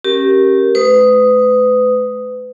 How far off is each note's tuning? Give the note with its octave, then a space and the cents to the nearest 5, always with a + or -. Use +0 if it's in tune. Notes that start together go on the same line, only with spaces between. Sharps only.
C#4 -25 G4 -15 A#4 +0
A3 -40 B4 +35 D#6 +0